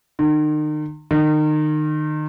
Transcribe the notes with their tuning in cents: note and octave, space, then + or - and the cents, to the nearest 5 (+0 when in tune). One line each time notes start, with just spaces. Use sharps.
D#3 -40
D#3 -30